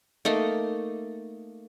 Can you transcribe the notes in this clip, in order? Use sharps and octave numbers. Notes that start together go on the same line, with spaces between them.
A3 A#3 D#4